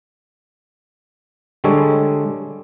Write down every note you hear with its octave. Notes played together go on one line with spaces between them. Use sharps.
D3 G3 G#3 A4 C#5